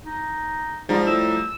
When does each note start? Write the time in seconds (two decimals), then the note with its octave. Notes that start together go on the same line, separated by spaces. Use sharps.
0.06 D#4
0.89 G#2 F3 G3 A#5
1.07 A2 E6